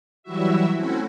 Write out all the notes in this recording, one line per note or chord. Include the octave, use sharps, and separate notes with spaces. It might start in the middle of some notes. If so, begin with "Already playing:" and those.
E3 F#3 G3 E4 F#4 E5
A3 C4 C#4 E4 F#4